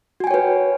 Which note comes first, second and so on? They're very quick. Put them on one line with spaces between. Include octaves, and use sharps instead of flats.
F#4 G#5 G5 C#5 B4